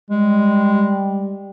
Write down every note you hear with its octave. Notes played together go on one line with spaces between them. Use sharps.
G3 G#3